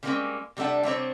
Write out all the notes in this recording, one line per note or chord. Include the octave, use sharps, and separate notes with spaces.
C#3 G3 G#3 A#3 C4 C#4
C3 G3 A3 D4 F#5
C3 G3 C4 C#5